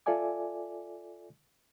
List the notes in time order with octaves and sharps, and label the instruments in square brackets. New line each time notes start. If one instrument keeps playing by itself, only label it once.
[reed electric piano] F4 A4 D5 E5 G#5 D6